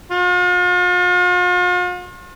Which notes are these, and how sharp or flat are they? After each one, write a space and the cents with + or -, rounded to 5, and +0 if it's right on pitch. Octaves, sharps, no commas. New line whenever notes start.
F4 +45